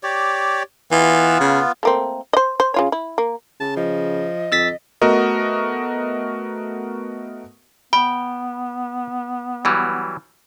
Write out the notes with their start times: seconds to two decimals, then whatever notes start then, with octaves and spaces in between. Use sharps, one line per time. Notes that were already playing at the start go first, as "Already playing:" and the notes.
0.03 G4 C#5 D5
0.92 E3 B3 F4
1.40 C#3
1.83 A3 A#3 C4
2.33 C5 D#5
2.60 C5
2.74 C#3 F4 C#5
2.92 E4
3.18 A#3
3.60 C#3 A5
3.76 F3 D#5
4.52 F2 E6 A6 B6
5.02 A3 B3 F#4 A#4 D#5
7.93 B3 G5 B5
9.65 E3 F#3 G3